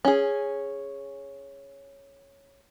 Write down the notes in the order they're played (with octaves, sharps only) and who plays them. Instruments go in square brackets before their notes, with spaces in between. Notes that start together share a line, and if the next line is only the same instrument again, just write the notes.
[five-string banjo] C#4 G#4